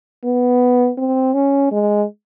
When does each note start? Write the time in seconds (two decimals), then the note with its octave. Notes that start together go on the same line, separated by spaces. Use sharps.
0.24 B3
0.98 C4
1.34 C#4
1.72 G#3